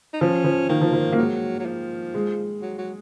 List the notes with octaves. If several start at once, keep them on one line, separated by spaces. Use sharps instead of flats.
D#4
F3 C#4
F3
D#3 A#3
F3
F3
A#3
F#3 G#3
F#3
F3
G#3
F#3
F#3